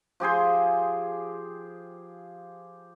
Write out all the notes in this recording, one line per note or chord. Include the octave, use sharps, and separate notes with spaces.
F3 G4 G#4 C5